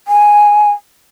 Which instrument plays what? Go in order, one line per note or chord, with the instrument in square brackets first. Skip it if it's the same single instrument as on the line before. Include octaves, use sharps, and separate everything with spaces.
[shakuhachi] G#5